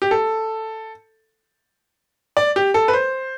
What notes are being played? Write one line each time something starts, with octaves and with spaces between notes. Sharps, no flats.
G4
A4
D5
G4
A4
B4
C5